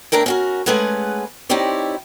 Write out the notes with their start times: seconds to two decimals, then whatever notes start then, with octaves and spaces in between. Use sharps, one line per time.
0.12 A2 D4 E4 A#4 G5
0.26 C#4 F#4 A#4
0.66 G#3 A3 C#4 G#4 B4 F#5
1.49 C4 D#4 E4 G4 C#5 D5